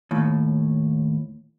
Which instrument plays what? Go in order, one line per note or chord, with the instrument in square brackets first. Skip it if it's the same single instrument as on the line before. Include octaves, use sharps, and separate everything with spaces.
[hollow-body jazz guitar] D#2 A2